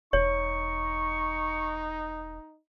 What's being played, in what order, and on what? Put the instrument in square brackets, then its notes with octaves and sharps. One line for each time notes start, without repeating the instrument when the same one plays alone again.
[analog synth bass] E1 [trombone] D#4 [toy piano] C#5 [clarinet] C#6